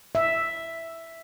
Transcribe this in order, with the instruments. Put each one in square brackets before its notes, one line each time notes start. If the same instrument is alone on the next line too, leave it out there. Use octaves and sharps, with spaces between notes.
[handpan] E5